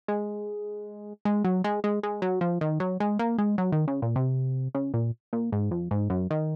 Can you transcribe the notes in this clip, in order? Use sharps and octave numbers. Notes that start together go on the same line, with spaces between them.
G#3
G#3
F#3
G#3
G#3
G#3
F#3
F3
D#3
F#3
G#3
A#3
G#3
F#3
D#3
C#3
A#2
C3
C#3
A#2
A#2
G#2
F2
G#2
F#2
D#3